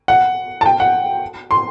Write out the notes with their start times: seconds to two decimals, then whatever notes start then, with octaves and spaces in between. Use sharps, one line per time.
0.08 F#5
0.61 A5
0.66 G5
0.80 F#5
1.51 C6